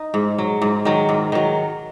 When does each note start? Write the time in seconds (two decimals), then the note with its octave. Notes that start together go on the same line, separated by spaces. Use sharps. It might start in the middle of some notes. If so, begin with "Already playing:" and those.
Already playing: D#4
0.14 G#2
0.38 F#3
0.62 G#2
0.85 D#3 F#3
1.09 G#2
1.32 D#3 F#3